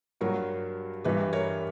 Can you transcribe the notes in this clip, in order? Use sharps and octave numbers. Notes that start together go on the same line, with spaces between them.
G2 F#3 F#4 A#4
G2 E3 G3 G4 B4
A#4 C#5